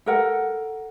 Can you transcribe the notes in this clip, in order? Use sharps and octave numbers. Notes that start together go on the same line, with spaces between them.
A4 A#4 F#5